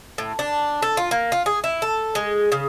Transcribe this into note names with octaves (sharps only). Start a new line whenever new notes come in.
A2
D4
A4
F4
A#3
F4
G#4
E4
A4
G#3
C#3